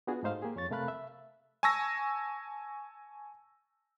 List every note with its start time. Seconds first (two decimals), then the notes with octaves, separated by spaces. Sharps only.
0.07 B3 D4 F4 F#4 G#4
0.23 G#2 A3 D#4 C5 F5
0.42 A#3 G4 G#4
0.56 F2 C#5 C#6 A6
0.71 C3 A3 A#4 F5 B5 F#6
0.88 E5
1.63 G#5 A5 C#6 E6 A#6